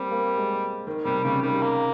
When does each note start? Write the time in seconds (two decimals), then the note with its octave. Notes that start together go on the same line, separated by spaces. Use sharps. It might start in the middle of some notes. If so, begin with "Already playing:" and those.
Already playing: G3 A#3 C4
0.11 A#3
0.37 G#3
0.87 D#3
1.05 C3 G3
1.24 C#3 G3
1.43 D#3 G3
1.62 A#3